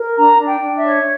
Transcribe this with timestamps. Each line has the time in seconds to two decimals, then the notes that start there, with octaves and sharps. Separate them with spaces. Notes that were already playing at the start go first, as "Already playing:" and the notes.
Already playing: A#4
0.16 D4 A#5
0.38 D4
0.46 G5
0.60 D4
0.76 E5
0.83 C#5